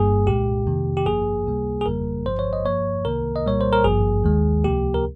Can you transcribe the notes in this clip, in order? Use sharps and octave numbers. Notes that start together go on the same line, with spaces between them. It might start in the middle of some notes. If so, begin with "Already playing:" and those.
Already playing: G1 G2 G3 A#3 G#4
C2 A#2 G#3 G4
F2 C3 D#3 A#3
G4
G#1 G2 F3 A#3 G#4
C#2 C3 G3 A#3
G#4
G1 F2 C#3 G3 A#3 A#4
G1 G2 F3 C5
C#5
D#5
G2 F3 A#3 C#5
C2 C3 D#3 A#3 A#4
D#5
C2 A#2 G3 A#3 C#5
C5
A#4
G#1 G2 F3 A#3 G#4
D#2 D#3 G#3
C#2 C3 F3 A#3 G4
A#4